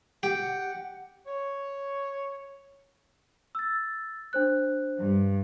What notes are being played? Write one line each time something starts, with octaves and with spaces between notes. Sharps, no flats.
G4 F#5
C#5
E6 A6
D4 C5 F#6
G2